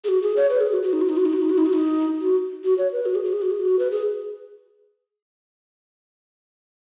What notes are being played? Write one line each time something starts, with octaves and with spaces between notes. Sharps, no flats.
G#4
F#4
G#4
C#5
B4
G#4
F#4
F#4
D#4
F#4
D#4
F#4
D#4
F#4
D#4
F#4
D#4
F#4
D#4
F#4
F#4
C#5
B4
F#4
G#4
F#4
G#4
F#4
G#4
F#4
B4
G#4